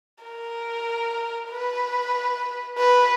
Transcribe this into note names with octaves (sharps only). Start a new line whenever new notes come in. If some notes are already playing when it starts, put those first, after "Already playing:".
A#4
B4
B4